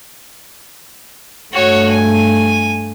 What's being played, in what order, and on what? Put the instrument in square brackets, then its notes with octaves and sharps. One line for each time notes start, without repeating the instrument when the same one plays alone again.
[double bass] G2 A3 [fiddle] F#4 C#5
[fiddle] G#5